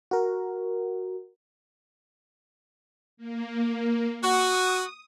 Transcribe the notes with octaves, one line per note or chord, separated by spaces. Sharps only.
F#4 A#4
A#3
F#4 D#6